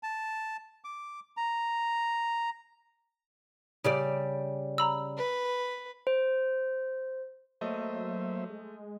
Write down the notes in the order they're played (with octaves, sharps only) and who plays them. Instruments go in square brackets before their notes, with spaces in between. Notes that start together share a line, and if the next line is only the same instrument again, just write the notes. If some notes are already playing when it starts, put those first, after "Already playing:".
[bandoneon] A5
D6
A#5
[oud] C#3 G3 D5
[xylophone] A#5 B5 E6
[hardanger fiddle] B4
[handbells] C5
[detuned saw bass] F#3 [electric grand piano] A3 D#5 [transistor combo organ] A#3 C5 E5
[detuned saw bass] G#3